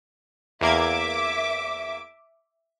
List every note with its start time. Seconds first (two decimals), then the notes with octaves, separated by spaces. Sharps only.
0.61 E2 A#3 E5 D6 G#6